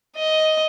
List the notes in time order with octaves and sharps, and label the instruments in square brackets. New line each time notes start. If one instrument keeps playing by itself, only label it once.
[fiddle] D#5